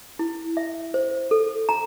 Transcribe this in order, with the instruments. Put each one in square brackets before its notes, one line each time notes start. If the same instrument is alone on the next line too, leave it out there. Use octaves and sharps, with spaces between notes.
[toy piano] E4
E5
C5
A4
A#5